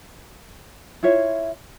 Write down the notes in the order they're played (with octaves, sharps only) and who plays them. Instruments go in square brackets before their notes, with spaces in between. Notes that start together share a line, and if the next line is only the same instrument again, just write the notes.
[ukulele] E4 F4 C#5 E5